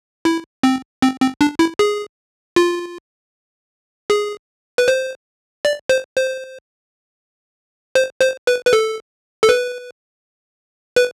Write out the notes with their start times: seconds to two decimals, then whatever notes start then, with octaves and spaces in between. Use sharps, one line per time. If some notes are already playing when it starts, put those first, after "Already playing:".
0.25 E4
0.63 C4
1.02 C4
1.21 C4
1.41 D4
1.59 E4
1.79 G#4
2.56 F4
4.10 G#4
4.78 B4
4.88 C5
5.65 D5
5.89 C5
6.16 C5
7.95 C5
8.21 C5
8.47 B4
8.67 B4
8.73 A4
9.43 A4
9.49 B4
10.96 B4